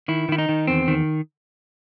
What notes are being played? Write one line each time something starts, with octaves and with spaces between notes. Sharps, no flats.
D#3 E4
D#3 E4
D#4
D#3
E2 C4
D#3